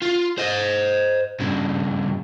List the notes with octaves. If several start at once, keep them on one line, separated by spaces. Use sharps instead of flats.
F4
C5 D#5
G2 C#3